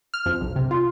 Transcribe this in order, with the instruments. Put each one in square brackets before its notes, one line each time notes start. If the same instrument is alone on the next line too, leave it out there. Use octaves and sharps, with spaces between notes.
[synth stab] F6
F2
B1
C3
F4